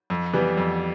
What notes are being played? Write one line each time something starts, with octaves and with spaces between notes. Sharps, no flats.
F2
E3 G3 B3
F2